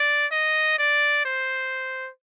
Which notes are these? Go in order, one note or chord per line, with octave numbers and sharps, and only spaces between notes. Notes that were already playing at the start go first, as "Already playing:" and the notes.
Already playing: D5
D#5
D5
C5